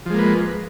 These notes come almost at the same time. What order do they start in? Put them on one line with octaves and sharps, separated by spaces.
F3 G#3 A#3 B4